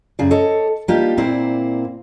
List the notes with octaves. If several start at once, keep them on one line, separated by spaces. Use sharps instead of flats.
F#2 C#3 G#4 D5
A4 C#5 D#5
G3 A#3 D4 D#4 F4 G4
A#2 A#3 C4 E4 C5 D5